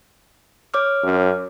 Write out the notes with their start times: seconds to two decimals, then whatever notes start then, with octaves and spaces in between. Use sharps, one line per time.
0.74 C#5 D6 F6
1.03 F#2